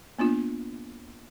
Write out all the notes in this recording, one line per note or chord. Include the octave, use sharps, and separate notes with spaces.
A#3 B3 D4 F4